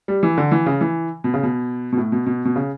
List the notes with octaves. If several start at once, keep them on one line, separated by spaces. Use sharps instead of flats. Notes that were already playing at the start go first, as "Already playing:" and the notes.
G3
E3
D3
E3
C#3
E3
B2
C#3
B2
B2
A2
B2
B2
B2
C#3